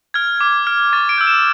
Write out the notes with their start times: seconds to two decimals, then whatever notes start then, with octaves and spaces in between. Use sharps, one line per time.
0.14 F6 G#6
0.41 D6
0.67 F6
0.93 C#6 A6
1.09 D7
1.18 E6 G6
1.27 E7